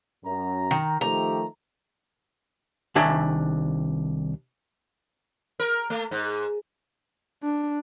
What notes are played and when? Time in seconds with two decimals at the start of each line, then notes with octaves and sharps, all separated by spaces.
0.25 F#2 A#5
0.71 D#3
1.01 D#3 F3 A3 G4 A#5
2.95 C2 D#3 D4 E5 G#5
5.59 A#4
5.90 A3
6.11 G#2
7.43 D4